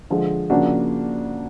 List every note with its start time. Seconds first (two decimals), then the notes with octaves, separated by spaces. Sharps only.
0.10 D3 F3 G#3
0.50 C#3 F3 A#3 D4 F#4